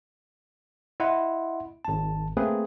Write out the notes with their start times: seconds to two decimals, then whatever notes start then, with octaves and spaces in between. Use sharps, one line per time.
1.00 E4 D#5 F#5 C6
1.85 G#1 A5
2.37 A3 A#3 C4 G#4 B4